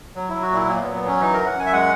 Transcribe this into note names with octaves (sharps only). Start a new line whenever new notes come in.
F#3
F#3 E4
F#4
A#2 E4
A#2 A#3
B3
F#3
B3
F#3 C#4
E3 D#4
F#2 A#4
F#5
F#2 G#5
E5
G#3 F#5